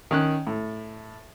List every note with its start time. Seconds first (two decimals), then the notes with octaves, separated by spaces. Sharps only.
0.11 D#3 C#4 F#6
0.47 A2